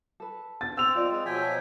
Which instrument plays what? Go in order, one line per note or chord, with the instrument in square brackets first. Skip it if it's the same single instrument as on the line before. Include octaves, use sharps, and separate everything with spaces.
[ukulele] A4 B4
[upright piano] A6
[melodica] C4 [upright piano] E6 F7
[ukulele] F4 D5 D#5
[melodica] G#3 C4
[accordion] B2 F3 F#3 [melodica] E5 G5 G#5